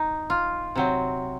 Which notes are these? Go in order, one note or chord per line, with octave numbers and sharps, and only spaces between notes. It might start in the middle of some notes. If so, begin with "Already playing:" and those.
Already playing: D#4
F4
C3 F#3 C4